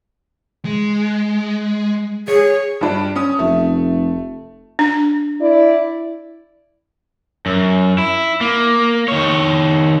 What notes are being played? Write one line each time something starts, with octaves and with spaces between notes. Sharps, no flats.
G#3
G#4 C#5
G2 D4
C#4 D#6
F1 A3
D4
E4 D5
F#2
E4
A#3
D#3 C#5